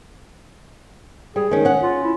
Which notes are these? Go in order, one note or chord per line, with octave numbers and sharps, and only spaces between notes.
G3 G#4
D#3 C#4
C#4 F#5
F4
E4